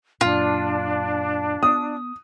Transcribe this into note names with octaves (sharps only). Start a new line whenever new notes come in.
F#2 A#2 D4 F4
B3 D#6